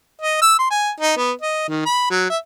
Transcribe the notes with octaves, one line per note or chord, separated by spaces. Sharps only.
D#5
E6
C6
G#5
D#4
B3
D#5
D#3
B5
F#3
E5